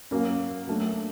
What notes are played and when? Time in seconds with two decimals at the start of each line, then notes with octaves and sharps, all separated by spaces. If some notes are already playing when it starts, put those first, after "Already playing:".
0.11 F#3 A#3 C#4
0.68 F#3 A3 D4